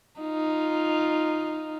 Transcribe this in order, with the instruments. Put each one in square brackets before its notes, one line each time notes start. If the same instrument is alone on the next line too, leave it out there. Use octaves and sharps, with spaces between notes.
[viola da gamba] D#4 F4